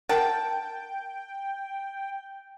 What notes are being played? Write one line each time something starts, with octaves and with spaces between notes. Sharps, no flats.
A#4 F#5 G5 A5